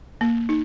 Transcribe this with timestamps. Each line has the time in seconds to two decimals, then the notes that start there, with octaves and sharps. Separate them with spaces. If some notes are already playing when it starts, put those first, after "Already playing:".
0.21 A#3
0.49 D#4